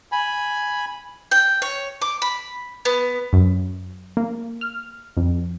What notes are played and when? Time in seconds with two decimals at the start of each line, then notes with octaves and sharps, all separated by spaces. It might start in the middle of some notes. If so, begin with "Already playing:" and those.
0.12 G#5 B5
1.31 G5
1.62 C#5
2.02 D6
2.22 B5
2.85 B3
3.33 F#2
4.17 A#3
4.61 F6
5.17 F2